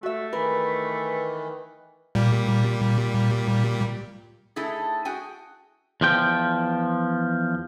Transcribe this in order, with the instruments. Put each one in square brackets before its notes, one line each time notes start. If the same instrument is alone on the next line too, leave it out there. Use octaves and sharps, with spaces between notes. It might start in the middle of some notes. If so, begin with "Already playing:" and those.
[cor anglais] A3 [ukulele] F#4 E5
[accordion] D#3 E3 [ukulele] A#4 [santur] B4
[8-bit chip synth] A#2 G3
[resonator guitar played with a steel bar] A3 D#4 E4 G#4
F#4 G#4 G5 G#5
[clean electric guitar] E2 F3 G5